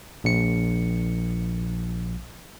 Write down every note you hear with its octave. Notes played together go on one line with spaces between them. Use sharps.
A#1 C#7